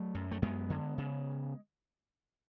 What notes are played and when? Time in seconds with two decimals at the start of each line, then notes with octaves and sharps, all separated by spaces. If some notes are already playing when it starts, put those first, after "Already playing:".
Already playing: F#3 A3
0.15 F#2
0.31 A3
0.42 F#2 G#3 B3
0.70 D3
0.98 C#3